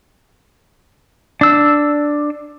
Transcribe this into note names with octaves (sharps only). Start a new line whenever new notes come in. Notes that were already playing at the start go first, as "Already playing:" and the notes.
D4 E6